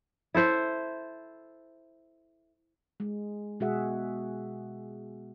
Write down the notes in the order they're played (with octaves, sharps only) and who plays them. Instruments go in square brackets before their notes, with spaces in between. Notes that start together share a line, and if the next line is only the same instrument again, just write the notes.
[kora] E4 A4 C5 E5
[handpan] G#3
B2 G#3 F#4 G#4 E5 F#5